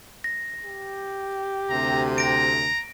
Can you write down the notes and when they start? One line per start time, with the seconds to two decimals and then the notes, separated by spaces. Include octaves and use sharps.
0.24 A#6
0.65 G4
1.70 D2 C3 A#5
2.18 A#5 A#6 D7